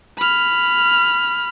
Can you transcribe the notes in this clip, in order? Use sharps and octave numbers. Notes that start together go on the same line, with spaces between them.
B5 F6